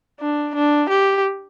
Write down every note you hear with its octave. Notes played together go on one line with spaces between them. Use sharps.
D4
D4
G4